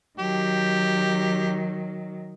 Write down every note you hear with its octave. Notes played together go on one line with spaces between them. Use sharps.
D#3 F#3 G4